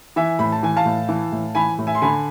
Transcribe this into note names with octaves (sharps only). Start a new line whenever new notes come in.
E3 E5 G#5
A2 B5
A5
E3 G#5
F5 A5
A2
E3
A2
E3 G#5 B5
A2
E5 G#5
C6
D3 G#5 B5